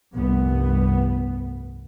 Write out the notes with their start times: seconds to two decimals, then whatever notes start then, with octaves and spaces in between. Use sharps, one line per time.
0.14 F1 C2 G2 B3